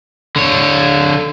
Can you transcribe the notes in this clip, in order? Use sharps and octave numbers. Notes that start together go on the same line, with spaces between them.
D3 C#5